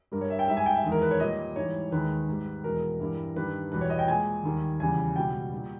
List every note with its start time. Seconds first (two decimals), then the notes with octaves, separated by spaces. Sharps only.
0.12 G2 G3 A#4
0.21 C#5
0.30 E5
0.39 G5
0.48 G#2 G3 E5
0.57 G#5
0.66 G5
0.75 E5
0.84 E2 D#3 G#3
0.92 A#4
1.02 B4
1.11 C#5
1.20 A#2 G3 D#5
1.56 G#2 E3 G3 C#5
1.92 D#2 D#3 G#3 B4
2.28 G#2 G3
2.64 E2 B2 G#3 A#4
3.00 G2 E3 G3
3.36 G2 D#3 G3 B4
3.72 E2 B2 G3 B4
3.81 C#5
3.90 D#5
3.99 G5
4.07 A#2 G#3 G#5
4.43 D#2 D#3 G3
4.80 E2 C#3 G3 G#5
5.16 C#2 B2 G3 G5
5.52 A#2 G3